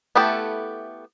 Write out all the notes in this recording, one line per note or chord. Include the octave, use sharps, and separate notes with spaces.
A3 B3 E4 G4 A4